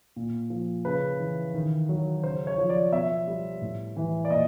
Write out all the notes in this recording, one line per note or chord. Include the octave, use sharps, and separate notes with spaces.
A#2
F3
C#3 B4
E3
D#3
F#3
C#3 C5
C#5
F3
D5
B2 E5
G3
A2
E3
D5
A#2 D#5